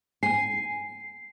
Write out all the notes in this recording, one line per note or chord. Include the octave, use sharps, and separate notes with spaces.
G#5 C7